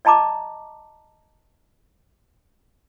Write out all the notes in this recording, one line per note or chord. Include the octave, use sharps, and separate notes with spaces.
D5 D#5 A5 A#5 D6